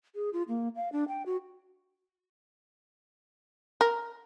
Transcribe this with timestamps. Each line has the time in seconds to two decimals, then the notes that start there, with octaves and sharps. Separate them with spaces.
0.15 G#4
0.33 F4
0.48 A#3
0.76 F5
0.92 D4
1.08 G5
1.26 F#4
3.81 A#4